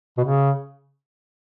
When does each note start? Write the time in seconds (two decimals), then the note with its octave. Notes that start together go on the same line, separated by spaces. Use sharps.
0.17 B2
0.24 C#3